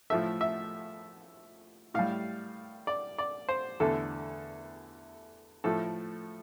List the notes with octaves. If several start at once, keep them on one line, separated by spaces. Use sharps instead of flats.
A2 F3 A3 E5
E5
A2 G3 F5
D5
D5
C5
E2 D3 A3 A4
A2 F3 A3 A4